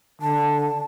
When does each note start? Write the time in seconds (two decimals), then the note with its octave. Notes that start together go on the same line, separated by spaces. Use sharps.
0.22 D3 A5